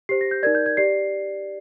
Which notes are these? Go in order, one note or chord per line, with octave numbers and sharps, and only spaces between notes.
G4 C5 C7
A#6
G6
D#4 A#4 D5 G#6
G6
G#6
G4 D5 C7